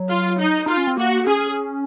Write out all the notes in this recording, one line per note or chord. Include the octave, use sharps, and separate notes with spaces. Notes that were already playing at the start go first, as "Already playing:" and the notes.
Already playing: F#3
F4
D#4
D#4 F4
C#4
C4
A#3 F#4
C#4 G#4